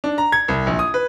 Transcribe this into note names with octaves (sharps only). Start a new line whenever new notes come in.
D4
A#5
G#6
C2
A#1
D#6
B4